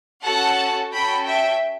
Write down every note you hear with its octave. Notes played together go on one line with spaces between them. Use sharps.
C#4 F#4 A4 F#5 A5
C#4 F#4 A4 G5 B5
E5 G5